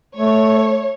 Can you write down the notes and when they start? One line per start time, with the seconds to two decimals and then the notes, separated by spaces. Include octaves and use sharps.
0.16 A3 C#5